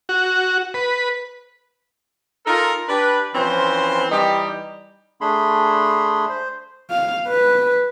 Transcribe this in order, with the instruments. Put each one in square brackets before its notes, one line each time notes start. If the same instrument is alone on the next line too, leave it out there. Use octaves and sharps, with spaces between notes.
[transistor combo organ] F#4
B4
[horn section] D#4 F4 A4 A#4
D4 G4 B4
E3 F3 C4 C#4 C5
E3 G3 D#4 G4
[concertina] A3 D4 G#4 B5 C6
C5
[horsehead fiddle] F5
B4